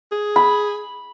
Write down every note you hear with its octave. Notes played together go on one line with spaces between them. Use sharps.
G#4
B5